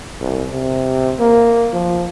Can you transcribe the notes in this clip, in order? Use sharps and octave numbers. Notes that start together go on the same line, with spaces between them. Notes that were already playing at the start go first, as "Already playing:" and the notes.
C2
C3
A#3
F3